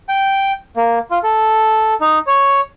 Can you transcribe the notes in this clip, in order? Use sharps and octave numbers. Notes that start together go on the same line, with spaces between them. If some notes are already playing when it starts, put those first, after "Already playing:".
G5
A#3
F4
A4
D#4
C#5